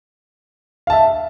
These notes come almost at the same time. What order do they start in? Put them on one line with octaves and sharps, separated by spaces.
F5 A5 E5